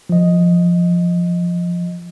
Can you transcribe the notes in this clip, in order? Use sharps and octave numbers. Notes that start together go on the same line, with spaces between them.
F3 D#5